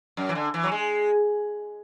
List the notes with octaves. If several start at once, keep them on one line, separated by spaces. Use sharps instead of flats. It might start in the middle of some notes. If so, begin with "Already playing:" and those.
F#2
E3
D3
E3
F#3
G#3